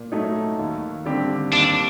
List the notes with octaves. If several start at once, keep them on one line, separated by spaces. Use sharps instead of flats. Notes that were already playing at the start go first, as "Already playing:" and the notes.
Already playing: A#2
F#3 A3 D#4
D#2
D3 G3 C4 G4
D#2 D4